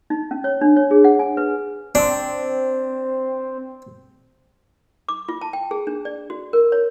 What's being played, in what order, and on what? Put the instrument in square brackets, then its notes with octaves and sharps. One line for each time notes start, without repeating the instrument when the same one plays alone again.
[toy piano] D#4
C#4
C#5
D4
C#5
G#4
F#5
G#5
B4
[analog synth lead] C4 [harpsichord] D4
[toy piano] D6
F4
A5
G5
G#4
D4
D5
F#4
A#4
C#5